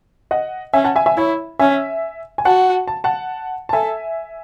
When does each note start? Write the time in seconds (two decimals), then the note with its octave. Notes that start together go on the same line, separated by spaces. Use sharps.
0.31 D#5 F#5
0.74 C#4 E5 G#5
0.84 F#5 A5
0.96 E5 G#5
1.06 E5 G#5
1.17 E4 C#5 E5
1.59 C#4 E5 G#5
2.38 G#5
2.45 F#4 F#5 A5
2.88 A5
3.04 F#5 A5
3.69 A5
3.73 A4 E5 G#5